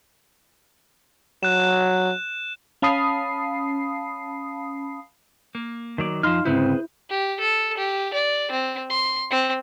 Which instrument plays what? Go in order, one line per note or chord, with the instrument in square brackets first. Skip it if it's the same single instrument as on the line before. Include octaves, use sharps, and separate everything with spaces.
[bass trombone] F#3 [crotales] F#6 E7
[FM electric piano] C#4 F5 A5 B5 D#6 C7
[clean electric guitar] A#3
[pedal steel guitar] D#3 F#3 D5
[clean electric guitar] F2 F3 [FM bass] D#4 [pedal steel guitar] F5 C6 F6
[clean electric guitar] D2 G#2 C#3 [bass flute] C4 [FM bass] E4 [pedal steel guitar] G#4 B4 C5
[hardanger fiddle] G4
A4
G4
D5
C4
C6
C4